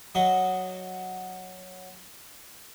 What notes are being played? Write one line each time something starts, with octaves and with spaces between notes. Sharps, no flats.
F#3 F#4 D#5